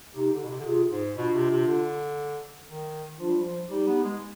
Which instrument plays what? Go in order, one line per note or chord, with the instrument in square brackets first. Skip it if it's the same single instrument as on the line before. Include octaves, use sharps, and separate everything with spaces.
[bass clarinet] C3 [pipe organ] D#4 G4
[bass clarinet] D3
B2
C3
D3
[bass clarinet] C3 [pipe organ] F4 G#4
[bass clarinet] G#2
[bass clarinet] B2 [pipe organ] D4 F4
[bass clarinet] C3
C3
D3
D#3
[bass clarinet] F3 [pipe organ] D4 F4
[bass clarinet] G3
F3
[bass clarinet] G3 [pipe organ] D#4 G4
[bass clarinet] B3
G#3